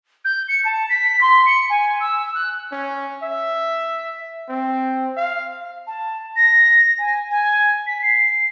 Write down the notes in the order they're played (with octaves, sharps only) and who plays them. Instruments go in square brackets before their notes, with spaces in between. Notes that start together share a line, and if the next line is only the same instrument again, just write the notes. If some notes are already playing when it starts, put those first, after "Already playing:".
[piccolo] G6
C#7
A5
B6
C6
C#7
G#5
E6
F#6
[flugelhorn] C#4
E5
C4
F5
[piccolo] A5
A#6
G#5
G#5
B6
C7